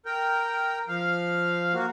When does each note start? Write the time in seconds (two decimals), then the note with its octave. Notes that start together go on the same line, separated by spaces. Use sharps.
0.06 A#4 G5
0.88 F3 F5
1.74 A#3 F#4